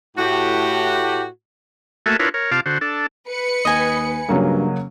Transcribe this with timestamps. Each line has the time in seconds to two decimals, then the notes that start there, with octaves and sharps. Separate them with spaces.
0.17 A2 F#4 G4
2.06 A3 A#3 F#4 A4 E5 G#5
2.19 D4 E4 F4 A#4 B4 C#5
2.34 A#4 C#5
2.51 C3 F4 F5 A5 D6
2.66 D3 F#4 C5
2.81 D4 A4
3.27 B4 C#7
3.65 D#2 D#5 G#5
4.29 G2 C#3 F#3 A#3